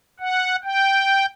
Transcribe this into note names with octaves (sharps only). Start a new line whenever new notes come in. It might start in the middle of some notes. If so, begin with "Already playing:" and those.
F#5
G5